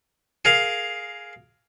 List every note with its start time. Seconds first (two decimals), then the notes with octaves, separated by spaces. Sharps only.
0.45 G#4 A#4 F5